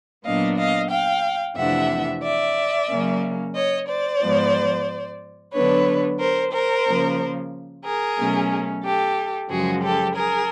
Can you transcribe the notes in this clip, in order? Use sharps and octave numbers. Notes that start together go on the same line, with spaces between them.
A#2 F#3 B3 D4 D#5 F5
D#5 F5
F5 G5
F2 C3 E3 A3 D4 E5 F#5
D5 E5
C#3 F#3 A#3 C#4
C#5 D#5
C5 D5
G#2 F3 G#3 B3
D3 F#3 B3 D4 B4 C#5
A#4 C5
A#4 C5
C#3 F3 A#3
G#4 A#4
B2 F#3 A3 C#4
G4 A4
F#2 C#3 F3 G#3 F#4 G#4
G4 A4
G#4 A#4